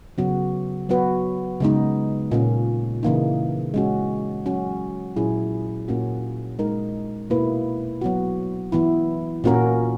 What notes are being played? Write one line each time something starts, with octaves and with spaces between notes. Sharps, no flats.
C#3 F#3 B3 F#4
F#3 B3 F#4 B4
C#3 G#3 B3 D#4
A#2 A#3 C#4
C#3 E3 A#3 D#4
G#3 C#4 F#4
F#3 C#4 F#4
A#2 F#3 C#4 E4 G#4
A#2 A#3 C#4 F#4
G#3 D#4 A#4
B2 A#3 E4 B4
F#3 B3 F#4
E3 B3 E4
A#2 A#3 C#4 F#4 A#4